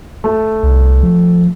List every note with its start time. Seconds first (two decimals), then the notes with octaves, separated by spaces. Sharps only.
0.24 A3
0.63 C2
1.03 F3